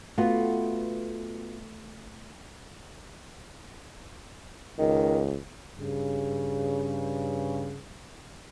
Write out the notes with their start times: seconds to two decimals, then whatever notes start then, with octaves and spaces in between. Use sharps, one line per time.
0.18 A3 B3 F4 F#4
4.79 C#2 D#3
5.78 G2 C#3